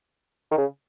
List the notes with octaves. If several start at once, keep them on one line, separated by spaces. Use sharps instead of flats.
D#3
C#3